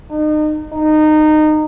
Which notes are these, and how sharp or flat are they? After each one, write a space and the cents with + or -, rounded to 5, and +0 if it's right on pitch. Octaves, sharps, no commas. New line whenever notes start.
D#4 -35
D#4 -20